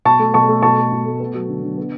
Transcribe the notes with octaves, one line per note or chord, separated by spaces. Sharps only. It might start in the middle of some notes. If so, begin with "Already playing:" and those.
B2 A5 C#6
A3
B2 A5 C#6
A3
B2 A5 C#6
A3
B2
A3
B3
F#3
D3
D3
B3